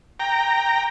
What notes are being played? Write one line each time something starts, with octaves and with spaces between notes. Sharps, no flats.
G5 A#5